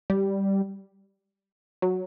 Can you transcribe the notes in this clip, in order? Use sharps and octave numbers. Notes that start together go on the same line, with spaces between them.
G3
F#3